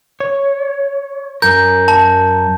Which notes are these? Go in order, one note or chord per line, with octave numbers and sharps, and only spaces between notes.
C#5
F#2 A#4 G6
A5